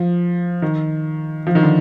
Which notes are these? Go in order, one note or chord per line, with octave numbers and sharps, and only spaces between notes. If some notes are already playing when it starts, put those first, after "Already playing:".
Already playing: F3
D#3
F3
D#3
D3